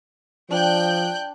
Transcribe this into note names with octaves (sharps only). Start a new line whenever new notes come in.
F3 D4 G5 F#6 G6